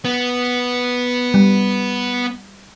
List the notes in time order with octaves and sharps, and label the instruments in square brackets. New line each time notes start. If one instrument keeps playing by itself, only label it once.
[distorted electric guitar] B3
[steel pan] G3